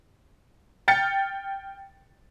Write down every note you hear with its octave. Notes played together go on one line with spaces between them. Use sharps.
G5 F6 A6 C#7